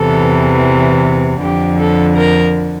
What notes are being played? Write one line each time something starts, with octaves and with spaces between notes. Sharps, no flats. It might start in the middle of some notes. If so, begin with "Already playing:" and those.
Already playing: E2 C3 E3 A4
F2 D3 G4
A4
A#4